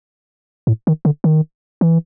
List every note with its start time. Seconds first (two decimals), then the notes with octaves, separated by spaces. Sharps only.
0.67 A2
0.87 D#3
1.05 D3
1.24 D#3
1.81 E3